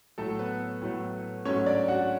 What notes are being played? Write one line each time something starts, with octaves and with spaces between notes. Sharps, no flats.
A2 F#3 A3 A4
B3 B4
A2 F#3 A3
G#2 F#3 A3 C#4 C#5
D4 D5
F#4 F#5